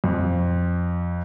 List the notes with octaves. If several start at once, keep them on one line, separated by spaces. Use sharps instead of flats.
F2